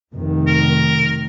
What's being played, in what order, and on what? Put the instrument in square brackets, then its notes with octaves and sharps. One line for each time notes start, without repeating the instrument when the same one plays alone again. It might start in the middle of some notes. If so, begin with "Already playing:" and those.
[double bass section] F1 D#3
[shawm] A#4